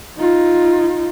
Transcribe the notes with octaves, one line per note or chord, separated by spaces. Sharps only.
D#4 F4